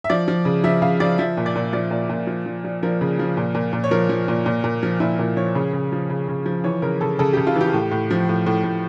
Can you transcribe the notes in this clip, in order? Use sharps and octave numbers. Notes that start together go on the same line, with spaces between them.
E5
F3 D5
F3
C#3
F3 E5
C#3 F5
F3 D5
F3 E5
A#2
D5
A#2
F3 D5
A#2
A#2
F3
F3
F3
F3 A#4
C#3
F3
A#2
A#2
A#2
C#5
F3 A#4
F3
A#2
A#2
A#2
F3
A#2 E4
A#2
F3 C#5
C#3
C#3
F3
C#3
C#3
F3
E3 C#5
C#3 A#4
C#3 A4
C#3 A4
C#3 G4
F4
E3
G4
A2
A2
F3
A2
A2
A2